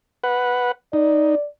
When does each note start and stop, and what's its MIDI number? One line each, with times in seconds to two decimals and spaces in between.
0.24 0.72 71
0.24 0.72 78
0.93 1.35 63
0.93 1.47 74